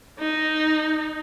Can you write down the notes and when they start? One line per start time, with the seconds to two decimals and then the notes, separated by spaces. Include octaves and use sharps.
0.20 D#4